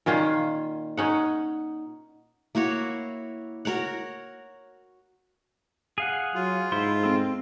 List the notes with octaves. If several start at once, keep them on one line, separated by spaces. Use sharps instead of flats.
A#2 D#3 C#4 F4
C#4 D#4 F#5
A#3 E4 F#4 C#5
F#4 A#4 C#5 F#5
G#4 F5 F#5
F#3 F4
G#2 E4 C5 C6
C4 A4